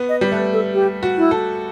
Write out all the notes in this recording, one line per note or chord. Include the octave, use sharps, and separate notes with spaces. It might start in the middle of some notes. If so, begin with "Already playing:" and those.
Already playing: B3
D#5
G3
A3 B4
A4
G4
F#4
E4
A4